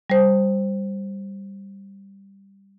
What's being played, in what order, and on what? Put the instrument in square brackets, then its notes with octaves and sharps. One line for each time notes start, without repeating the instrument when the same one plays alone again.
[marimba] G3 C5